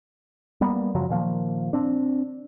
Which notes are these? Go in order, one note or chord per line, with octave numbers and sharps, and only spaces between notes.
G3 A#3 B3
F#2 C#3 F3 F#3
A#2 D#3 F3 A#3
C4 D4